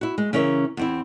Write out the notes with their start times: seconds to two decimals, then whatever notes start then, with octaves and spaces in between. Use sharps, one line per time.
0.01 E4 F#4
0.18 G#3
0.33 C#3 E3 C#4 A#4 C#5 E5
0.77 E2 C4 E4